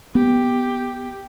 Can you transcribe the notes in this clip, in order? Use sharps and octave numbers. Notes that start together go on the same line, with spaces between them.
B3 G4